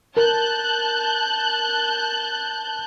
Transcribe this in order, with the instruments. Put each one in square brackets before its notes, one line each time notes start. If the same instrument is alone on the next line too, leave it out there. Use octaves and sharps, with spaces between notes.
[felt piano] A#4 [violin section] A5 F#6 G6